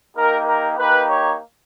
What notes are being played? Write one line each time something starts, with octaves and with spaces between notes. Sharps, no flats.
A#3 D#4 G4 A#4
A#4
A#3 D#4 G4 B4
C#5